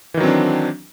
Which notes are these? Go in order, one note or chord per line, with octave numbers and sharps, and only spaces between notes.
D#3 E3 F#3 C4 D4